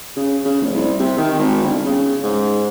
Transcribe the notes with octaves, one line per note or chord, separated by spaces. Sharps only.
C#3
C#3
F1
C2
C3
D#3
G#1
G1
C#3
G#2